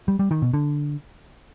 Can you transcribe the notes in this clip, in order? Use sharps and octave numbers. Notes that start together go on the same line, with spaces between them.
G3
G3
D#3
B2
D3